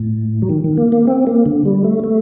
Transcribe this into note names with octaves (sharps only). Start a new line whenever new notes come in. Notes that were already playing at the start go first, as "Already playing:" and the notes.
Already playing: A2
F#3
D#3
D#3
A#3
A#3
C4
A#3
D3
G3
A3
A3